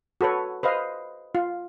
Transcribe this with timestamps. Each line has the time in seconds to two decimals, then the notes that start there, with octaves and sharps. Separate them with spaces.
0.21 F#4 A4 B4 C#5
0.63 B4 C5 D#5 F5
1.35 F4